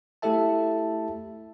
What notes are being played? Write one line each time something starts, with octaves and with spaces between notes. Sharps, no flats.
A3 E4 G4 A4 E5 A5